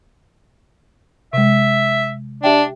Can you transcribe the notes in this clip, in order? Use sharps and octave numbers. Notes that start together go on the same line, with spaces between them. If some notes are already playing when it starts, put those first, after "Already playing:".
C3 G#3 E5
D4 G4 E5 G5